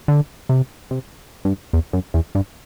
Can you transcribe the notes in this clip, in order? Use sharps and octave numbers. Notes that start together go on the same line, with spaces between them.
D3
C3
C3
G2
E2
F#2
E2
G2